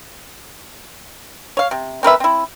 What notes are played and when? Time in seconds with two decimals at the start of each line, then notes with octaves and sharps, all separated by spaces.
1.57 C#5 F5
1.71 C3
2.03 C4 A#4 B4 E5
2.20 C4 E4